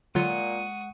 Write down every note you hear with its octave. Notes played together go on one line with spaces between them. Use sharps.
A#2 D3 F#3 G#3 F4 F#5 C#6 D#6